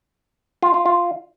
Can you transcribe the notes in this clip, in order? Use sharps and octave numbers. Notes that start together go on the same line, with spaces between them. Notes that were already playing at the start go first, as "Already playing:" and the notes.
F4
F4
F4